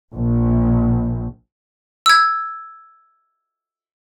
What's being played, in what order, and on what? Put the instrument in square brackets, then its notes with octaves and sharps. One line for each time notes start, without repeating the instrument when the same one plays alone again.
[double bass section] A#1
[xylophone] E6 G#6